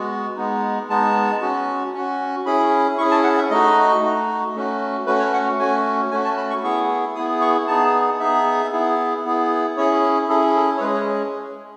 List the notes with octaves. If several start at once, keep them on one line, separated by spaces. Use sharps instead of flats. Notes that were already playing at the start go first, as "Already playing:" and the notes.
Already playing: G#3 B3 F#4
G#3 B3 D#4
G#3 B3 D#4 A5
C#4 F#4
C#4 F#4
C#4 E4 G#4 B5
C#4 E4 G#4 C#6
A5
F#5
E5
A3 D#4 F#4 D#5
A3 D#4 F#4
A3 C#4 F#4
A3 C#4 F#4 B4
C#5
F#5
A3 C#4 F#4 G#5
A3 C#4 F#4 G#5
A5
B5
C#6
B3 E4 G#4 C#6
B3 E4 G#4 D#6
C#6
B3 D#4 G#4 A5
B3 D#4 G#4 E5
B3 E4 G#4
B3 E4 G#4
C#4 E4 G#4 C#5
C#4 E4 G#4 A4
A4
C#5
G#3 C#4 G#4 B4
C#5